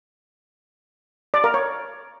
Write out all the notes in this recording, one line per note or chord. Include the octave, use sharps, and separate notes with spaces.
D5
A#4
C#5